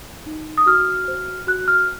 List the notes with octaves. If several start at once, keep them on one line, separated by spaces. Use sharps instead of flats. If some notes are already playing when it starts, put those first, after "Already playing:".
D#4
D#6
F#4 F6
C5
F#4 F#6
F6